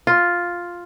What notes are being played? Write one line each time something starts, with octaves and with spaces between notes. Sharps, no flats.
F4